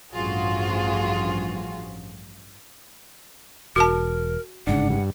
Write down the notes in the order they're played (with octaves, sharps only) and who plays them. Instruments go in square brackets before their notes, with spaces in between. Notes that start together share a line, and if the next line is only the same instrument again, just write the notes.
[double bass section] A1 G2 F3 [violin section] F4 F#4 G#4
[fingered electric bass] E1 [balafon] F#4 A5 [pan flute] A#4
[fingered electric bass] G1 G#2 C#3 [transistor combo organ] D4 [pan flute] F#5
[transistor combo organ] G2